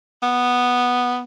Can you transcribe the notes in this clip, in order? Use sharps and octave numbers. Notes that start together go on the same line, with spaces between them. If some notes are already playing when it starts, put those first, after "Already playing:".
B3